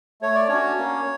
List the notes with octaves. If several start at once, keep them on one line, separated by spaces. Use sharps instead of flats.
A3 C#5
D5
C#4 D4 F#4 C#5
A#3